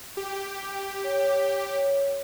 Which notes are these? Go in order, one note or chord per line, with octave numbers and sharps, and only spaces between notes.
G4
C#5
C#5